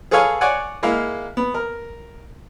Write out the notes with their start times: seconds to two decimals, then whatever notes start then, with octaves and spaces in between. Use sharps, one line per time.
0.11 G#4 A4 B4 C#5 F5 G#5
0.41 C#5 D5 F#5 G#5
0.83 G#3 A#3 E4 F5
1.37 B3
1.54 A#4